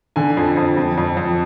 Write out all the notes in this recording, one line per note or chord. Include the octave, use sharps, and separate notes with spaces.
D3 G#5
F2
F2
F2
F2
F2